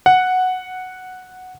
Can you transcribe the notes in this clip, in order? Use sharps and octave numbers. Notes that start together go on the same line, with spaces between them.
F#5